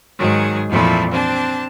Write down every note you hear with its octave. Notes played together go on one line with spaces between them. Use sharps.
G#2 D#3 F#3 G#4
F2 A#2 E3 F3 A3 E4
C4 D4 A5